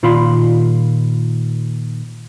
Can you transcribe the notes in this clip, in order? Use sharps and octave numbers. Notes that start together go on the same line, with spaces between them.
A#2 D#3 F4 F5 B5 C6